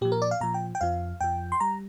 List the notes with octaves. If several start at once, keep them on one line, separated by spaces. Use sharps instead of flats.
A#2 F3 G4
A#4
D5
F5
A#2 F3 A#5
G5
G5
F2 F3 F5
F2 F3 G5
C6
G3 A#5